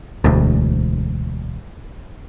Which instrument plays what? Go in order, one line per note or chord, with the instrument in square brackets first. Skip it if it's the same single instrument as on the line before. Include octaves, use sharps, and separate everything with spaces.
[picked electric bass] E1 D2